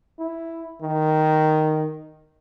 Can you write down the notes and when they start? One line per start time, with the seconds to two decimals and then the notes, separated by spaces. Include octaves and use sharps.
0.19 E4
0.82 D#3